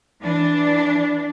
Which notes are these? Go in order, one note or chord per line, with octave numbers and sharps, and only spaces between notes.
E3 D4